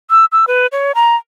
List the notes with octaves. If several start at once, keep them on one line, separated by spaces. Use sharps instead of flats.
E6
E6
B4
C#5
A#5